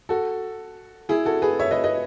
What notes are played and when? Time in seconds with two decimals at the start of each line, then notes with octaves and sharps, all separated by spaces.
0.09 F#4 A4
1.09 E4 G#4
1.25 F#4 A4
1.42 G#4 B4
1.59 C#5 E5
1.71 B4 D#5
1.84 B4 D#5